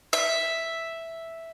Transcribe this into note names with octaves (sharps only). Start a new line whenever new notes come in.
E5